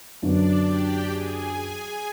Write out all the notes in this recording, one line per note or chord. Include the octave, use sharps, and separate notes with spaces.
F#2 D3 F#3 B3 D4 D5
G4 G5
G#4 G#5
G#4 G#5